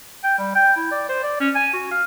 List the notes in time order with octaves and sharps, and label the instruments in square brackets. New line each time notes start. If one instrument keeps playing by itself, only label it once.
[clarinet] G5
G3
G5
E4
D5
C5
D5
C#4
G#5
F#4
F5